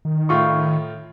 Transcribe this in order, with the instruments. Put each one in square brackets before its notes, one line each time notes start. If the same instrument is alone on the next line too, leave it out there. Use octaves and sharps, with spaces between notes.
[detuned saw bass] D#3
[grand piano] A2 F4 C#6